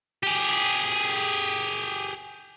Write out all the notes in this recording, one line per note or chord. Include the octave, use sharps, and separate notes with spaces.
G4 G#4